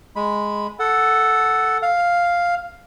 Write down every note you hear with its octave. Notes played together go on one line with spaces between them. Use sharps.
G#3 B5
A4 F#5
F5